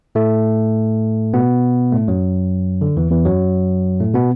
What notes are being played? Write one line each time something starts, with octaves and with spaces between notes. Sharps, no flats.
A2 A3
B2 B3
A2 A3
F#2 F#3
D3
E2 E3
E2 E3
F#2 F#3
A2 A3
B2 B3